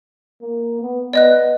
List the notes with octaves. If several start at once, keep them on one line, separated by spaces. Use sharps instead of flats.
A#3
B3
B3 D5 D#5 F#6